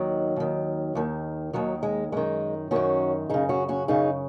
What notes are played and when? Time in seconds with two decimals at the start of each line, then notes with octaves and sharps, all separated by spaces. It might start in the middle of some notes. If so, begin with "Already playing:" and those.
Already playing: D#2 D#3 F#3
0.36 D#2 D#3
0.95 D#2 D#3
1.53 D#2 D#3 F#3
1.83 G#3
2.12 F#2 D#3 G#3
2.71 F#2 D#3 C#4 F#4
3.29 F#2 C#3 D#4 G#4
3.49 C#4 F#4
3.68 C#4 F#4
3.88 F#2 C#3 D#4 G#4